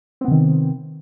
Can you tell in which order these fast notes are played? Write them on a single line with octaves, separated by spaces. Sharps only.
C4 B3 C3 D#3